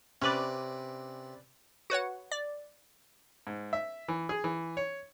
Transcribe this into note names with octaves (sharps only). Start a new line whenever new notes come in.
C3 C#4 B4 D5
F#4 B4 C#5 F#5
D5
G#2
E5
E3
G#4
E3
C#5